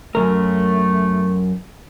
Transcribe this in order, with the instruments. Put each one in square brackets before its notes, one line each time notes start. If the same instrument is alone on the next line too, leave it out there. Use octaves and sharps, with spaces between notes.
[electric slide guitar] F#2 B2 A#4 [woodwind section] A3